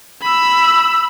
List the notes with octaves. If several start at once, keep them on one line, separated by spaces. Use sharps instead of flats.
B5 E6